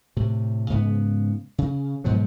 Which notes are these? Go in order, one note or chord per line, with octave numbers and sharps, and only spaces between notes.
A2 C3
G#2 C#3 B3
C#3
G#2 B2 F3 F#3